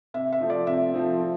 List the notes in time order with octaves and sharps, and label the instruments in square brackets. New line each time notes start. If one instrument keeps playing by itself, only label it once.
[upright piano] C3 [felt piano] E5
[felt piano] E5
[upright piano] F3 A3 C4
[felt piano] D5
[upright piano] C3 [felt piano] E5
[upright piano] F3 A3 C4
F3